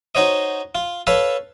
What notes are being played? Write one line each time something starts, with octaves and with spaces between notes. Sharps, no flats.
D#4 F#4 C5 C#5 D#5
F4
A4 B4 C#5 F5 A5